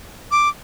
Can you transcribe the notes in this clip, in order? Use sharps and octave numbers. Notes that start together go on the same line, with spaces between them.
D6